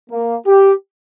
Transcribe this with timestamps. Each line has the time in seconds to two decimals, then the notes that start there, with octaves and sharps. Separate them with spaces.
0.10 A#3
0.46 G4